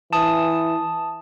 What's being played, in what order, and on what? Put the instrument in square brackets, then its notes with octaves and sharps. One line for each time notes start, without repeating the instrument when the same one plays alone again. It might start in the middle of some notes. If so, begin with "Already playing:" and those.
[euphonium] E3 [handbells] A5 D#6